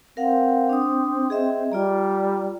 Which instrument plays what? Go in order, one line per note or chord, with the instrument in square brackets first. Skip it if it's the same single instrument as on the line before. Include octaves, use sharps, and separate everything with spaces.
[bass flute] C4 [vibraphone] A#4 F5 F#5
[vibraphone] D4 D#6
G#4 D#5 E5
[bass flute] G3 [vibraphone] F4 D5 A#5